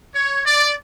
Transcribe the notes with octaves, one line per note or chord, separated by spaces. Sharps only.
C#5
D5